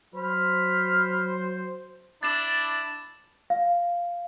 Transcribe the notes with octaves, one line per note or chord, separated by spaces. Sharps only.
F#3 C5 B5 F6
D4 E4 A6 E7
F5